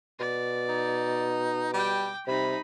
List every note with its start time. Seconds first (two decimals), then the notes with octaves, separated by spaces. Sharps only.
0.20 B2 D5
0.69 D#4
1.74 G3 G5 D6
2.27 C3 G3 D#4 B5